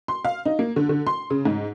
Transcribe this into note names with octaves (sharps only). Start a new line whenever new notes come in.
C6
F5
D#4
A#3
D3
D3
C6
C#3
G#2